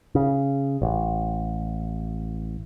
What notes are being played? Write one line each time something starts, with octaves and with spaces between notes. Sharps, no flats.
C#3
A1